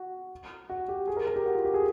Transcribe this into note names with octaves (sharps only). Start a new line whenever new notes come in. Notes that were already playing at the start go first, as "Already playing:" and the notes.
Already playing: F#4
F#4
G4
G#4
A#4
A#4
G4
F#4
F4
G4
G#4